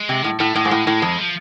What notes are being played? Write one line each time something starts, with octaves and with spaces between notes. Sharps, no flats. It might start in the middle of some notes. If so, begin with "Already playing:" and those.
Already playing: G#3
C3
A2
A2 A3
A2 G#3
G#2
A2
A2 G#3
F2
F3